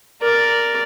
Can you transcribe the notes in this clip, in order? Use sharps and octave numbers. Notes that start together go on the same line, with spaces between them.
A#4 D5